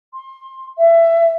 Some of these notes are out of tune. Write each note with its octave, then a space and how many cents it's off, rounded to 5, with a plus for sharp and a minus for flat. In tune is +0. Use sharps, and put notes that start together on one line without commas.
C6 +25
E5 +20